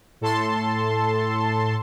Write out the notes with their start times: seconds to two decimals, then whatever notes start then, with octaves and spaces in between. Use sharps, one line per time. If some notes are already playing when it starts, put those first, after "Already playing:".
0.21 A2 A4 A5 C6